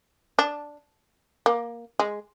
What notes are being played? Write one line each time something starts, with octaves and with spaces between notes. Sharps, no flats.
D4
A#3
G#3